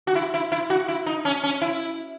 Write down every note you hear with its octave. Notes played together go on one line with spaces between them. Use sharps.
F#4
E4
E4
E4
F#4
E4
D#4
C#4
C#4
E4